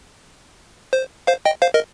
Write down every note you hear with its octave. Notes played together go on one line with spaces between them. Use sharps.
C5
C5 F5
D#5 G5
C5 F5
A#4 D#5